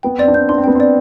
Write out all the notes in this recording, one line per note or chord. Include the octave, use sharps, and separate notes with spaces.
B3 G5
C4 D5
D4
C4 G6
D4 C6
C4
B3 G5
C4 D5